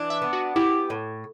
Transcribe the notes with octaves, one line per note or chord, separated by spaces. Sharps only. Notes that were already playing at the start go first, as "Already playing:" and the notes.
Already playing: E3 D4
E5
B3
F#4
E4 G4
A2